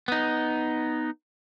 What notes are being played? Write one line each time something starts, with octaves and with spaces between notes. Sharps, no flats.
B3 D#4